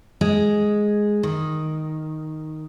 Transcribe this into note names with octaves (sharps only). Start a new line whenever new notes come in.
G#3
D#3